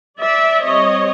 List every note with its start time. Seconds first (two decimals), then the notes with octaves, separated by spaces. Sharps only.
0.20 D5 E5
0.63 G3 C4 C#5 D#5